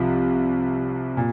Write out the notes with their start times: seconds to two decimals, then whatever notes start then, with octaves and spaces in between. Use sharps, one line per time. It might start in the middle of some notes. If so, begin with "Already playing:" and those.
Already playing: C2 C3 F3
1.17 A#2